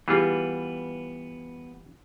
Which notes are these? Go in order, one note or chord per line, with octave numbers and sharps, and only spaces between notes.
E3 G3 B3 E4 F4 G4 G#4